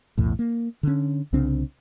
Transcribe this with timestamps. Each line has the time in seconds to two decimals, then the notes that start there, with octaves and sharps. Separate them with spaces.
0.18 B1 E2 A2
0.39 A#3
0.83 D3 C#4
1.33 C2 C#3 C4 D4